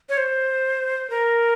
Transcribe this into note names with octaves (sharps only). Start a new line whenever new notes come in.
C#5
C5
A#4